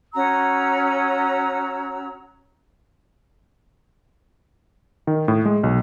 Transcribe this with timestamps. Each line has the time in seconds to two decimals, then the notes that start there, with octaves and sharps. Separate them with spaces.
0.14 C#4 F#4 A#5 E6
5.07 D#3
5.28 A2
5.45 G#3
5.63 B1